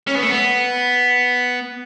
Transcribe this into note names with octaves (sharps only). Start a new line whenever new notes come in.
C#4
B3
A3
B3